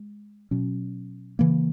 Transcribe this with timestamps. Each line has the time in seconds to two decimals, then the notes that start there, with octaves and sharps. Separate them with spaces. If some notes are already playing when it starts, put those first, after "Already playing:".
Already playing: G#3
0.51 B2 F#3 C#4
1.39 C#3 E3 A#3